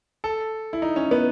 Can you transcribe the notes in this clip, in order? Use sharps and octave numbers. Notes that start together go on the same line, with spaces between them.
A4
E4
D#4
C#4
B3